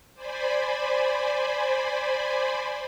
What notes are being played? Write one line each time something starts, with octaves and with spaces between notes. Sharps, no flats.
C5 D5 G#5 B5